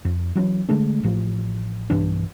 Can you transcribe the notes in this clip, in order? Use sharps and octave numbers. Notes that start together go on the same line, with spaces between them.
F2
E3 F#3 C4 C#4
D3 G#3 A3 D4
A1 A2 F3
B1 G2 E3 D4